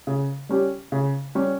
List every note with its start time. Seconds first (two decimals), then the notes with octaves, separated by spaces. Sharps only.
0.07 C#3
0.49 G3 C#4 G4
0.92 C#3
1.35 G3 C#4 G4